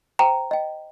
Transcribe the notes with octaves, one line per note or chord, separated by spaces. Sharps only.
C5 G5 A#5
D#5 G5